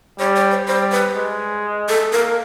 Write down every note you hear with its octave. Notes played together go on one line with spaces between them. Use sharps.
G3 C#5
C#5
C5
G3 C5
B4
G#3
A4
A#3 A#4